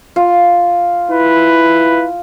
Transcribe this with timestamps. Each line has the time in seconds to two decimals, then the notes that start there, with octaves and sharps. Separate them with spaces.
0.16 F4
1.10 E4 B4